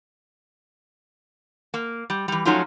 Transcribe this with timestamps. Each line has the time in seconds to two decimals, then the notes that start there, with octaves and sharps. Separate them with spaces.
1.74 A#3
2.10 G3
2.28 E3 G3
2.45 F3 F#3 A3 C#4 D#4 F4